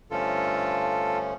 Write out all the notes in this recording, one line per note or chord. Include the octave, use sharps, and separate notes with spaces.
G2 D3 F3 A3 C#4 F4 A4